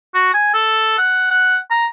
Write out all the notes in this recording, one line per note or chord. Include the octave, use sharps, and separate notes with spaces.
F#4
G#5
A4
F#5
F#5
A#5